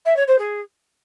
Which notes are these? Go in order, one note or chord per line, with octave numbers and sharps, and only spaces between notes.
E5
C#5
C5
G#4